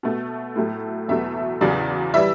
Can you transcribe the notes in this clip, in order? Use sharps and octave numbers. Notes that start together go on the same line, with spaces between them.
B2 A3
A2 F#3 A3
E2 B2 F#3 A3 E5
E2 C#3 F#3 D5
E3 G3 E5